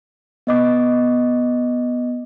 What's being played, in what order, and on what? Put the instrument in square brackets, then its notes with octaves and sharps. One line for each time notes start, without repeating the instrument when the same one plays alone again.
[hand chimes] B3 D#5 D6